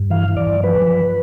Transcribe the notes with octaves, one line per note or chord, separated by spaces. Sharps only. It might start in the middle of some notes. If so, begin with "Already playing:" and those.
Already playing: G2
E3 F5
E3
D5
G2
F3 B4
F3